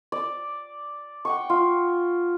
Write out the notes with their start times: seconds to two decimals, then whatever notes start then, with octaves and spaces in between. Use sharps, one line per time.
0.12 D5
1.25 F#5 G5 C#6
1.50 F4